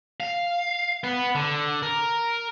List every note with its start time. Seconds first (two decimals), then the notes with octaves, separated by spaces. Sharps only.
0.20 F5
1.04 B3
1.35 D3
1.83 A#4